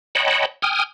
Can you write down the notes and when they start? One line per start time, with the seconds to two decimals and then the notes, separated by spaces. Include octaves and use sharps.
0.15 C#5 D#5 F#5 G5 A5 B5
0.62 G5 G#5 D#6 F6